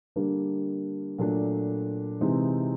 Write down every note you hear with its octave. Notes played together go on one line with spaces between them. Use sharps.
D3 G3 A#3 D4
A#2 F#3 A3 D4
C3 E3 G#3 C4 D#4